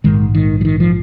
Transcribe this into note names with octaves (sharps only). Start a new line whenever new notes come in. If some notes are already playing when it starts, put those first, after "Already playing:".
A#1 G#2 D#3 G#3
D#3
F3
D#3
F3